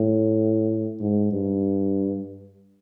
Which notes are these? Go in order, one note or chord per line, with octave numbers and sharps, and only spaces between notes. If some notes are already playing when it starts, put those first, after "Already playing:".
Already playing: A2
G#2
G2